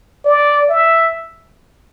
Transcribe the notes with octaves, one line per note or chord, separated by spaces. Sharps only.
D5
E5